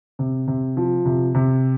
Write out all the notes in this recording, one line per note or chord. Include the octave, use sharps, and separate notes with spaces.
C3
C3
F3
C3
C3